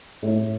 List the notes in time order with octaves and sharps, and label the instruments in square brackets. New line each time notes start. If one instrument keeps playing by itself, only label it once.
[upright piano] A2